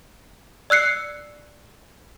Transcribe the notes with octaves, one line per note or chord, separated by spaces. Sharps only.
D5 E6 F#6 C7 C#7